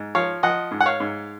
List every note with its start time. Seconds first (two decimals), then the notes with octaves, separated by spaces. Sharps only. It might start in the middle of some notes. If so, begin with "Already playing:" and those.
Already playing: G#2
0.15 F3 C#5 F5
0.43 F3 D#5 F#5
0.71 G#2
0.81 F#5
0.86 C#5 F5
1.00 G#2